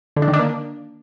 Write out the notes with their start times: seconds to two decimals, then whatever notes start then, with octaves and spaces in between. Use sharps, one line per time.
0.16 D3
0.22 D4
0.28 D#3
0.34 D4
0.39 A#3